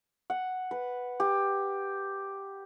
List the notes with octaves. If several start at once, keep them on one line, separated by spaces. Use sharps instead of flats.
F#5
B4
G4